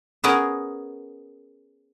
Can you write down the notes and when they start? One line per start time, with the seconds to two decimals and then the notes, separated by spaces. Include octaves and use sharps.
0.24 B3 C#4 G#4 A#4